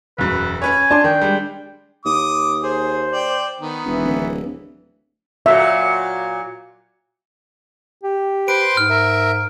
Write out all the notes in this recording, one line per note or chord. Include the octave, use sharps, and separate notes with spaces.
E1 F#2 B4
C#4 B4 C#5 G#5
D4 A5 C6 D6
D#3 G5
G3 G#3
D#2 D6 D#6
G#4 C5
D5 G5
D#3 B3
E1 E3
D1
A#2 F#3 E5
G4
B4 C5 C6 D7
G#2 F6
A#4 E5